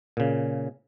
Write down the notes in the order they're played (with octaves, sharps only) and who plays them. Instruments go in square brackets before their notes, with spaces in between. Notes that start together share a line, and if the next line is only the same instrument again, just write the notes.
[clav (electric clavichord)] A#2 C#3